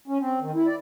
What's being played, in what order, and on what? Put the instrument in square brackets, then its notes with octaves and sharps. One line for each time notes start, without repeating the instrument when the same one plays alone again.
[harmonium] C#4
C4
D#3
E4
D5